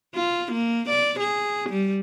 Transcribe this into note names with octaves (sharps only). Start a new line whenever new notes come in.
F4
A#3
D5
G#4
G3